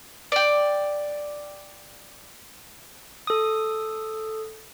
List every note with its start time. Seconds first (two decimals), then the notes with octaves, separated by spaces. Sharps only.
0.32 D5 G5
3.27 A4 D#6